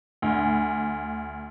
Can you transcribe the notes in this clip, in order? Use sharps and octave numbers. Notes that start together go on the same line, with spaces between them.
D2